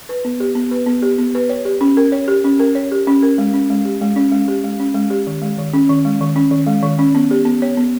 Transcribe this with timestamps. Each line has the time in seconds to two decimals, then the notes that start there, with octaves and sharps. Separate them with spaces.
0.09 B4
0.25 B3
0.40 G4
0.55 B3
0.71 B4
0.87 B3
1.02 G4
1.18 B3
1.35 B4
1.49 C#5
1.65 G4
1.81 C#4
1.97 A#4
2.12 C#5
2.28 G4
2.44 C#4
2.60 A#4
2.75 C#5
2.92 G4
3.07 C#4
3.22 A#4
3.38 G#3
3.54 C#4
3.70 G#3
3.85 G4
4.01 G#3
4.16 C#4
4.32 G#3
4.48 G4
4.64 G#3
4.80 C#4
4.94 G#3
5.10 G4
5.27 D#3
5.42 G#3
5.58 D#3
5.73 C#4
5.90 D#3
6.05 G#3
6.21 D#3
6.36 C#4
6.51 D#3
6.67 G#3
6.82 D#3
6.99 C#4
7.15 B3
7.31 G4
7.45 B3
7.62 C#5
7.77 B3